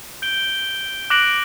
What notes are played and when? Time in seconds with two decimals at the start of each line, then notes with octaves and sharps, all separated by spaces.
0.22 G6 D7 G7
1.10 D6 F#6 A#6 D7 F#7